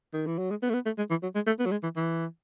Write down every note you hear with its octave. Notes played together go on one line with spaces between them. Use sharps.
D#3
E3
F#3
G#3
B3
A3
B3
A3
G#3
E3
F#3
G#3
A3
B3
F#3
G#3
E3
E3